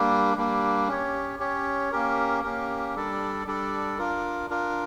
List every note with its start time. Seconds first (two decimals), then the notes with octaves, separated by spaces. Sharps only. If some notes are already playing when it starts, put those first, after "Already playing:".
Already playing: G3 A#3 D4
0.37 G3 A#3 D4
0.88 C#4 G4 C#5
1.39 C#4 G4 C#5
1.91 A#3 C#4 G4 A#4
2.43 A#3 C#4 G4 A#4
2.95 G3 D4 A4 D5
3.47 G3 D4 A4 D5
3.99 D4 F4 A#4
4.50 D4 F4 A#4